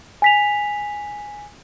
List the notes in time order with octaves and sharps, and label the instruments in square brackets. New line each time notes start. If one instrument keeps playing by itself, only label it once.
[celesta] G#5 B6 F7